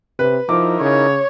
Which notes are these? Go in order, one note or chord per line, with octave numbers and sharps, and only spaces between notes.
C3 B4
F3 D#4 E4 A#4 D6
C#3 C#5